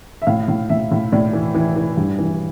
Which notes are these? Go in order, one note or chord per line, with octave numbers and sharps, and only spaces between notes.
E5
A2 F5
A2
A2 E5
A2
A2 D5
E3
E3
E3
G2
E3